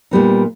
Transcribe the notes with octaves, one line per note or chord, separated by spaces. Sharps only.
A#2 G3 B3 D#4